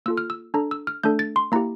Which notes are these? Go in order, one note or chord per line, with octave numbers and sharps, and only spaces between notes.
A#3 F4 A4 E6
F6
E6
D4 A4 A#5
E6
F6
A3 D4 A4 G6
A6
C6
A#3 E4 G4 A#5